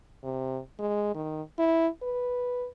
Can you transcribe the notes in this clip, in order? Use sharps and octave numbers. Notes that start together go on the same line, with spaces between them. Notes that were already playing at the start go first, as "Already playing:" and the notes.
C3
G#3
D#3
E4
B4